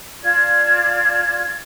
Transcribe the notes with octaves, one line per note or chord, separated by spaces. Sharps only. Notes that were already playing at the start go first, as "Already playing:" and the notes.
F4 D5 A5 G#6